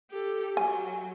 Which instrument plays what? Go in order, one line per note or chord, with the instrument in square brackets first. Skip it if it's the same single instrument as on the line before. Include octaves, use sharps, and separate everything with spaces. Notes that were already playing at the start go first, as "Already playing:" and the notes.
[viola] G4 A4
[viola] F#3 [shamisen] G#5